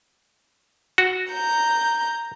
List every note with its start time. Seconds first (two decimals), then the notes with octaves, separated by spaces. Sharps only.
0.98 F#4
1.32 A#5 G6